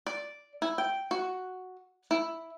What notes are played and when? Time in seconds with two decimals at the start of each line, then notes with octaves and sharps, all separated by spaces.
0.07 D5
0.62 E4
0.78 G5
1.11 F#4
2.11 E4